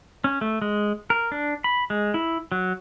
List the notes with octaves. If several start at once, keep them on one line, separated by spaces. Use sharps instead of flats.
C#4
A3
G#3
A#4
D4
B5
G#3
E4
F#3